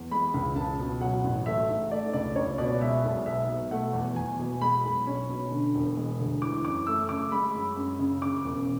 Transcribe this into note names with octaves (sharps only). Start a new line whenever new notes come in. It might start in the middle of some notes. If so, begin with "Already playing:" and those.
Already playing: E2
G#3 B5
C#2
C#2 A5
B2
F#3 F#5
A1
A3 E5
G#2
A3 D5
C#2 D5
C#2 C#5
B2 D5
G#3 E5
B1
B3 E5
B2
A3 F#5
E2
E2 G#5
B2
G#3 B5
B1
C#4
B2
D3
E1
G#3
D2
E3 D6
F#2 D6
A3 E6
C#3 D6
G#3 B5
F#2
F#2
C#3
C#3 D6
E1